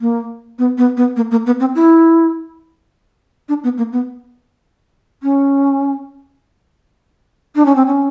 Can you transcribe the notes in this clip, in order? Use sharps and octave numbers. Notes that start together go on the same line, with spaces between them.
A#3
B3
B3
B3
A#3
A#3
B3
C4
E4
D4
B3
A#3
B3
C#4
D4
C#4
C4
C#4